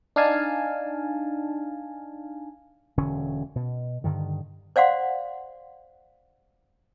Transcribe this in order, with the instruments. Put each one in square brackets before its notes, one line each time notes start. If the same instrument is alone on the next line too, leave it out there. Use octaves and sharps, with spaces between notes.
[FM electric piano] D4 D#4 F5 G#5 A5
[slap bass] E1 D3 C#4
B2
G2 D3 D#3
[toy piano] C5 D5 F5 F#5 C6